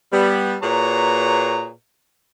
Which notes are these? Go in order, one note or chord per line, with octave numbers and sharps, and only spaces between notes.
G3 B3
A#2 F#4 G#4 B4 C#5 A#5